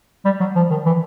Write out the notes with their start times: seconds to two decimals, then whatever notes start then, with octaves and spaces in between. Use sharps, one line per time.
0.25 G3
0.40 F#3
0.56 F3
0.70 D#3
0.86 E3